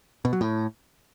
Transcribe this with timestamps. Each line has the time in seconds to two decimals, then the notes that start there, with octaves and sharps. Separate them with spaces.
0.25 B2
0.33 F#3
0.41 A2